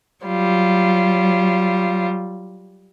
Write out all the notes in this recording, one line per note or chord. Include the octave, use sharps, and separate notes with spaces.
F#3 G3 F4